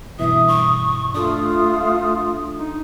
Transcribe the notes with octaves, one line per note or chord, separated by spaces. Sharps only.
G2 B2 E3 E5 D#6
C#6
A3 D4 F4 A4 D#6
D#4